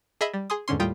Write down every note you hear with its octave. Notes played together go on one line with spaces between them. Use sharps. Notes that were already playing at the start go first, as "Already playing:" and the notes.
G#4 D#5 E5 B5
G3
G#4 G#5 C6 D#6
E2 G#2 D3 C#4 C6
D#2 A2 G3 F4 G5 D#6